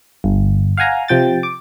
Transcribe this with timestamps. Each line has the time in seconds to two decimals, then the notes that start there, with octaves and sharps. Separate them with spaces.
0.24 G1
0.77 F5 F#5 G#5 A#5
1.08 C3 F3 G5 A6
1.43 D6